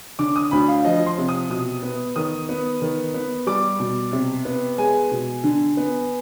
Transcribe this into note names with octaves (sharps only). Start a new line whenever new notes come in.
D3 D6
D#6
D2 B5
F5
F3 D#5
C6
C3
D#6
B2 D#6
B3
D#3 D#6
B3
D#3
B3
G3 D6
B2
C3
B3
G#3 G#5
B2
D3
B3